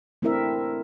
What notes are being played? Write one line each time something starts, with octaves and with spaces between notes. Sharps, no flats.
A3 C4 D4 E4 A#4 E5